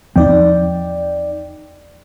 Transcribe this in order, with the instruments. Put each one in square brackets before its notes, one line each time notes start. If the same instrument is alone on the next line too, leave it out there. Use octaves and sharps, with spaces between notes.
[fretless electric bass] E2 F3 C4 [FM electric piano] D#4 D5 G5